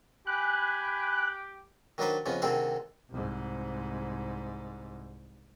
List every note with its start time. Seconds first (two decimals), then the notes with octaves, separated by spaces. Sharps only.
0.27 G4 G#5 B5 F#6
1.98 D#3 F#3 D4 D#4 B4 C5
2.26 F2 C#3 F3 B3
2.42 D2 C3 D#3 C4 G#4 A4
3.10 C2 G#2